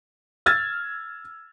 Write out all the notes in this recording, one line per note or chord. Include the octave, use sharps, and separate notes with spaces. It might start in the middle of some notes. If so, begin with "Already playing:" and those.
E6 F6 G#6 A6